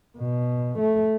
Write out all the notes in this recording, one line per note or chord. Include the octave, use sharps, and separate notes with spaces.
B2
A3